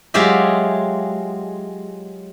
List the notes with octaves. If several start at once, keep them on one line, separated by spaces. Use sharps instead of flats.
F#3 G#3 F4 G4 G#4 E5